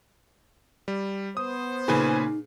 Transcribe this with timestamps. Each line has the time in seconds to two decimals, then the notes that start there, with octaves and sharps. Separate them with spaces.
0.88 G3
1.37 B3 C5 D#6
1.88 A#2 C#3 D#4 G#4 B4 G#5